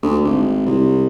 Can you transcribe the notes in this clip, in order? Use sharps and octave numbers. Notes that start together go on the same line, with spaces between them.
D2
G#1
C2